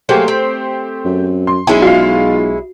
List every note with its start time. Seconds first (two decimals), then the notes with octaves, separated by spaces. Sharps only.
0.09 F#3 A3 A#3 G4 G#4 C5
0.28 C4
1.05 F#2
1.47 C6
1.67 B1 G#3 C#4 E4 G#5
1.82 F4 F#4 F5